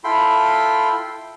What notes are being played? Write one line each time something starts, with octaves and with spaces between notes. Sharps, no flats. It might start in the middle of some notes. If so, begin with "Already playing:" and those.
E4 F4 A4 G5 B5 C6